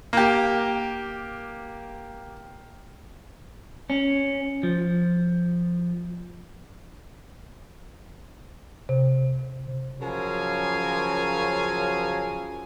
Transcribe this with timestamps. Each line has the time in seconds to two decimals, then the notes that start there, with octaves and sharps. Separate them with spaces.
0.13 A#3 G4
3.90 C#4
4.63 F3
8.89 C3
10.01 C#3 F3 F#3 A#4 F5 G#5